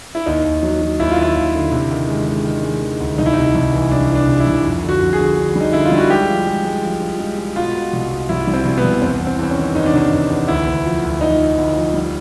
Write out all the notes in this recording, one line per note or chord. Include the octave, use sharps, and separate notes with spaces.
E4
D#2 D#4
D#2
F#3
F#3
D#2 E4
F4
D#2 E4
D#2
D3
C3
D#3
G#3
G#3
D#3
G#3
D#3
D2
C2 D#4
E4
C3 D#4
C2
E3
C2 D4
E3
D4
C3
E4
C2
F2
D3
F#4
F2
G#4
D3
D3
G3 D#4
D3 E4
F4
G3
F#4
G#3 G4
F3
G#3
G#3
F3
F3
G#3
G#3
B2 F4
B2
C2
B2
C2 E4
G3
C4
C2
B3
C2
E2 C4
E2
C4
E2 C4
C#4
D#3
E2 D#4
D4
C3 D#4
E2
E2
D2 E4
D2
F3
D2
F3 D#4
F3
D2
F3
G3